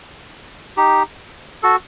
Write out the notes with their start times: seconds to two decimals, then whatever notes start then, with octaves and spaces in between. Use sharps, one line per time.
0.77 D#4 G4
1.63 F#4 A4